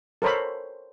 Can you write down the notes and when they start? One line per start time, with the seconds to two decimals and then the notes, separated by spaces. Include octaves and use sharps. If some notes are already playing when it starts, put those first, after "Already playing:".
0.22 A4 A#4 C5 C#5 B5